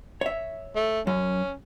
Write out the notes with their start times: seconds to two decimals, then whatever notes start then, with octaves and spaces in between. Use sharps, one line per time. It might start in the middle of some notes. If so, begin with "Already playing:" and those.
0.21 C#5 E5
0.76 A3
1.07 F#2 C#4